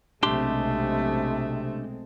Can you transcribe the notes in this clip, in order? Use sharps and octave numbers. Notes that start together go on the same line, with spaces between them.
B1 C3 G#3 A3 C4 D4 G4 C6